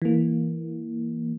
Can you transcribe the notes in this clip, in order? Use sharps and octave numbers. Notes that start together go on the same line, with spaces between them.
E3 A#3